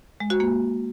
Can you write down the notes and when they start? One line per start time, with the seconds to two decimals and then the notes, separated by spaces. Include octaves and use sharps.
0.20 G#3
0.30 F#4
0.40 A#3